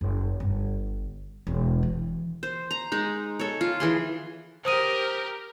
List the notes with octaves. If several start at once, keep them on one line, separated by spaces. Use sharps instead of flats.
F#1
G1
E1
E3
C5
A#5
G#3 D#4
A4 C#5
F4
E3 G#4 C6
G4 A#4 C5 D#6 D#7